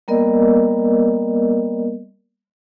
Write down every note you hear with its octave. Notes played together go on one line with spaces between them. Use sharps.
G3 A#3 B3 A#4 D5 D#5